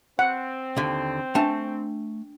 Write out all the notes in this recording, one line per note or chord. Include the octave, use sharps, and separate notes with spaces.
C4 F#5
D#2 D3
A3 D4 G5 A5